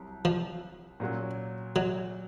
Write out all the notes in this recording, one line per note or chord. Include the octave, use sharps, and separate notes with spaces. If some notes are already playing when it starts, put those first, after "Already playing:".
Already playing: C2 C3 F#3
F3
A#2 F#3 C#4 F#4
F#3